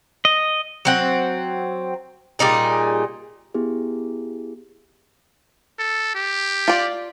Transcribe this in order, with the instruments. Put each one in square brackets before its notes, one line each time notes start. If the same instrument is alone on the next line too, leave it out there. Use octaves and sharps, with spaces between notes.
[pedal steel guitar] D#5
[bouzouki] F#3 C4 F#5
A#2 G3 D#4 G#4
[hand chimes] B3 E4 G4 G#4
[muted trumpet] A4
G4
[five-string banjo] F4 D5